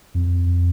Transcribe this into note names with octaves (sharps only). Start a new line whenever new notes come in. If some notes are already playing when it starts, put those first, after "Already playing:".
F2